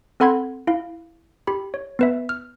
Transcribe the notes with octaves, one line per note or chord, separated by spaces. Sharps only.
C4 A4 F#5 B5 C6 G#6
E4 F5
G4 B5
C#5
B3 B4 E5
F6